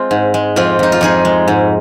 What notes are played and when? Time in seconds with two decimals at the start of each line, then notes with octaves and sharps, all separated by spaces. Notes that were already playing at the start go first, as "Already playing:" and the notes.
Already playing: G#3 C4 F4
0.11 G#2
0.34 G#3
0.56 F2 C4 F4
0.79 F2 D#4
0.92 F4
1.01 F2 D#4 G#4
1.25 G#3
1.47 G#2